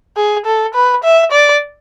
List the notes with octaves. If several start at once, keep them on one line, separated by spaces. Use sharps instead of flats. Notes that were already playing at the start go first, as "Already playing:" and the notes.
G#4
A4
B4
E5
D5